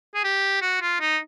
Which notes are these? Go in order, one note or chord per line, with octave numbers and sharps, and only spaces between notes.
G#4
G4
F#4
F4
D#4